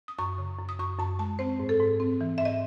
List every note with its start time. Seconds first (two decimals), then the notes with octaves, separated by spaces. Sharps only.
0.08 D#6
0.19 F#2 C#6
0.38 C#3
0.58 F#2
0.69 D#6
0.79 F#2 C#6
0.99 F#2 A5
1.19 G#3 A5
1.39 C4 C5
1.60 G#2
1.69 A4
1.80 G#2
2.00 C4
2.21 E3
2.38 E5
2.41 G#2 D#5